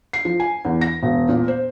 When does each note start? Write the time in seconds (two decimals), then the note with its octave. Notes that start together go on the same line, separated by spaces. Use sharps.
0.13 C7
0.25 F3
0.40 G#5
0.65 E2
0.81 A#6
1.03 E1
1.29 A#2
1.48 C5